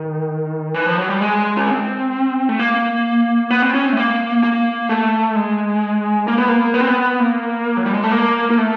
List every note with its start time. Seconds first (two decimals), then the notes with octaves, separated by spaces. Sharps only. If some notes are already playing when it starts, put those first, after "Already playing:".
Already playing: D#3
0.74 E3
0.86 F3
0.98 F#3
1.09 G3
1.21 G#3
1.57 C#4
1.67 C4
2.49 A3
2.59 A#3
3.51 B3
3.62 C4
3.74 C#4
3.85 C4
3.93 A3
3.97 A#3
4.43 A#3
4.89 A3
5.36 G#3
6.28 A#3
6.38 B3
6.49 A#3
6.74 B3
6.81 C4
6.88 B3
7.20 A#3
7.77 F#3
7.86 G3
7.94 G#3
8.04 A3
8.12 A#3
8.50 A#3
8.58 A3